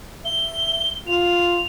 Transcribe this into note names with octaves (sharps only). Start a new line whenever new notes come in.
E5 G7
F4 F7